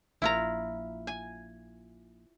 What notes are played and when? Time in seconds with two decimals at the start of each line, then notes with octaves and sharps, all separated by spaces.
0.22 A#1 E4 F4 A#5
1.07 G#5